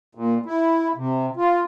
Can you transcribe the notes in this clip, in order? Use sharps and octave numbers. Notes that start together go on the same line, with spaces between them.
A#2
E4
C3
F4